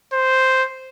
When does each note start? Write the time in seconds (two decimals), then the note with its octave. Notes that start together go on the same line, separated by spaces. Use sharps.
0.13 C5